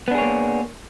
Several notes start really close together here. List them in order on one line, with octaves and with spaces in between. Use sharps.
B3 D4 G#4 C#5 A#3